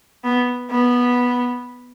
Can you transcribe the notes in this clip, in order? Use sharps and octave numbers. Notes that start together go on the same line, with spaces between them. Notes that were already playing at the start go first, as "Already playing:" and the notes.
B3
B3